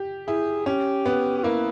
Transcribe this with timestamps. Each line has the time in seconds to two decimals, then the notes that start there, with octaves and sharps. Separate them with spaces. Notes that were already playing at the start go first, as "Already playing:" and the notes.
Already playing: G4
0.28 E4 G#4
0.66 C#4 G4
1.06 B3
1.38 G4
1.43 A#3 E4